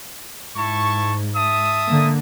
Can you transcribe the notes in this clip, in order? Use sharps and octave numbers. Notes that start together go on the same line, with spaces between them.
G#2 E4 A5 C#6
E5 A5 D#6
D3 A#3